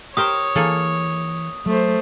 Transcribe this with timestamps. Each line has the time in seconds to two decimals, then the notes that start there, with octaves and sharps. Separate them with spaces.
0.17 G4 A#4 C5 C#5 D#6
0.56 E3 A#3 G#4 A4
1.66 F#3 A3 C5